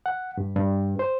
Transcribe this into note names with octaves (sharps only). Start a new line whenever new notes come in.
F#5
G2
G2
C5